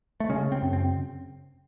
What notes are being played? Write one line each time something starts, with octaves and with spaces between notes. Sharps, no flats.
A3
C#3 G#3
C4
F#2
C4